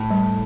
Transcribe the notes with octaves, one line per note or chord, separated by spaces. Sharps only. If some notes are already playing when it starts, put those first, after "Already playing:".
Already playing: A2
G3